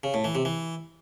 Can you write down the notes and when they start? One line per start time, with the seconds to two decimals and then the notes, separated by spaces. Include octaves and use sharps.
0.03 C#3
0.14 A2
0.24 E3
0.35 C3
0.45 E3